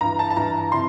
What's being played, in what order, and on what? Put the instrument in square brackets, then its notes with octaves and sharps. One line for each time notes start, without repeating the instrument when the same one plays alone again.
[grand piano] G2 E3 A#5
A5
A5
G2 E3 A#5
C3 E3 C6